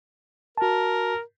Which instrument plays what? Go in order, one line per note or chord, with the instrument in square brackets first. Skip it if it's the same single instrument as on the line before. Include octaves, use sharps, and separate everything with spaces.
[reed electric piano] F#4 A5 [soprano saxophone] A#4